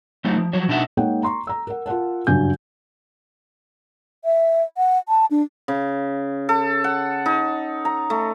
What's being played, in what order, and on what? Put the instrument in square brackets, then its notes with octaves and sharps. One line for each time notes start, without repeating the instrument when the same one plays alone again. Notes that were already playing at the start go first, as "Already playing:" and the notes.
[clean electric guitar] F#3 A3 C4 D#4
F3
F3 F#3 C#5
B2 D4 D#4 G4 E5 F#5
[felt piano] G#3 A#3 D#4 C#5 F#5 G5
A#5 C6 C#6
A#5 E6
A#4 F#5
F4 A#4 F#5 A5
F#1 G2 F#3 G#5 G6
[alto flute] E5
F#5
A5
D4
[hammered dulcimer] C#3
A4
F#5
D#4
A#5
A3